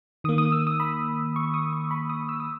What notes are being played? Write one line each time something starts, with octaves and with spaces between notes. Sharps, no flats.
D#3 A#3 D#6
D#6
E6
D#6
B5
C#6
D#6
C#6
B5
D#6
E6
D#6